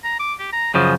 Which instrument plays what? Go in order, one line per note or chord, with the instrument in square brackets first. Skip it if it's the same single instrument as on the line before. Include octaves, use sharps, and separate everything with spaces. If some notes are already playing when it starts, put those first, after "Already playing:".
[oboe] A#5
D6
G4
A#5
[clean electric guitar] F#2 C#3 F3 [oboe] D#5